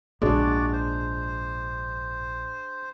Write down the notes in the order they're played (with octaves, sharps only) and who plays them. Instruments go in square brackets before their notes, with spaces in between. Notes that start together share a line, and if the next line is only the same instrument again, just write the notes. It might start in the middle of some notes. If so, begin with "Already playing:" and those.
[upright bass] A#1 [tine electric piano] G#2 [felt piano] G#3 D4 [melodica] F#4 D5
[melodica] C5